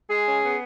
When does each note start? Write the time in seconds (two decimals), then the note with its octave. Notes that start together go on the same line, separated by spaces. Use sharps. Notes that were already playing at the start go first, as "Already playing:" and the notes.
0.09 G#3 G#4
0.26 C#4
0.43 B3